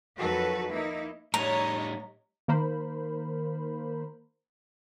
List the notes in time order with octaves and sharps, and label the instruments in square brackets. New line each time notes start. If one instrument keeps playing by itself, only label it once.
[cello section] F2 D#3 F#3 F#4 A4 B4
A#3 D#4 E4
[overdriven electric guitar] A2 G3 [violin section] C#5 D#5 [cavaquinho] A#5
[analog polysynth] D#3 A#3 A#4 C5 B5